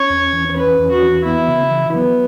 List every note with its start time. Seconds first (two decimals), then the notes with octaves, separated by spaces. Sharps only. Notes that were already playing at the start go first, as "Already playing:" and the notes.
Already playing: C#4 C#5
0.10 E2
0.33 E3
0.56 C#4 B4
0.79 E2
0.91 F#4
1.03 E3
1.24 B3 E4
1.48 C#3
1.70 E3
1.93 F#3 B3